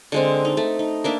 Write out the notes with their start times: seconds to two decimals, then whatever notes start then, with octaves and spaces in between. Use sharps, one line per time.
0.12 D3 G#3 C4
0.45 D#4
0.57 A3
0.79 D#4
1.04 A#3 D4 E5